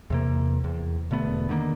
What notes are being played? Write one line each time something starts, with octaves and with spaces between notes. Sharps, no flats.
E2 C3 A#3
E2
E1 D3 A3 B3
D3 D#3 G3 A#3